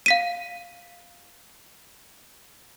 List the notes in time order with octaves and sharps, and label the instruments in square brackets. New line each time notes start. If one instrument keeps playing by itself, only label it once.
[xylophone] F5 B6 D#7